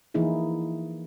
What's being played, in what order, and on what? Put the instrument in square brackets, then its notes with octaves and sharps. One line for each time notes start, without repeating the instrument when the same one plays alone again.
[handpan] E3 F3 A#3 D#4 E4 G#4